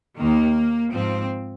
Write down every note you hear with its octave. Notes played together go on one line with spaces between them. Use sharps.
D#2 D#3 A#3
G#2 F3 C4